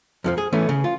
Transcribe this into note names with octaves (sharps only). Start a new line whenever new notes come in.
F2 D#3 F3
G#4
E3 A3 B3 C#4
C#3
F4